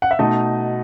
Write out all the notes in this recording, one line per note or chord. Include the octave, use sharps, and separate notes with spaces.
F#5
E5
B2 A3 D#4 D#5